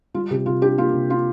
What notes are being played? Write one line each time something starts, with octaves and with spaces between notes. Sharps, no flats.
G3 F4
C3 G4
C3 F4
D4 G4
A#3 F4
C3
D4 F4